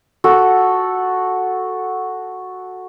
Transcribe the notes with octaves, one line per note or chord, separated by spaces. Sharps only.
F#4 A4